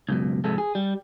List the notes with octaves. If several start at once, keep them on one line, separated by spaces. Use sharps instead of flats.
C#2 F#2 B2
F2 G#2 C3 G#3 A4
G#4
G3